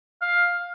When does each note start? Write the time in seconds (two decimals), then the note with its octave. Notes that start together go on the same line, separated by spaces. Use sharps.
0.21 F5